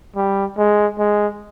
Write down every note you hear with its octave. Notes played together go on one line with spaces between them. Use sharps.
G3
G#3
G#3